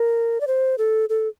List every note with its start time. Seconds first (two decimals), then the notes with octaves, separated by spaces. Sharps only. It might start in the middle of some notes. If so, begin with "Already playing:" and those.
Already playing: A#4
0.41 D5
0.47 C5
0.78 A4
1.09 A4